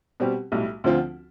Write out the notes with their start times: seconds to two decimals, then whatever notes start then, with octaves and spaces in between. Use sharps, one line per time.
0.20 B2 G3 C4 G4
0.52 B1 A2 G3
0.84 D2 D3 F3 C4 F4